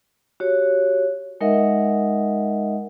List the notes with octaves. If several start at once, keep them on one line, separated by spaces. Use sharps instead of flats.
F#4 G4 C#5
G#3 D#4 A#4 D#5 E5 F#5